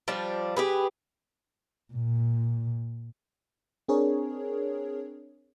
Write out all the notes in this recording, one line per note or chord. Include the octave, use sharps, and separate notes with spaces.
F3 G3 D4
G4 G#4 B4
A#2
C4 D4 G#4 A#4 C#5